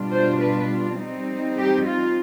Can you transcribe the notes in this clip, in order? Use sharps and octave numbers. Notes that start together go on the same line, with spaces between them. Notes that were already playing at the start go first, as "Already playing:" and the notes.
Already playing: B2 G3 D4 F4
C5
B4
G3 C4 D#4
G4
F4